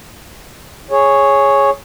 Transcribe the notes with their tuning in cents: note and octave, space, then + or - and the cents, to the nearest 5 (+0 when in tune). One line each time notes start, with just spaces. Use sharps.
G#4 +0 C#5 +0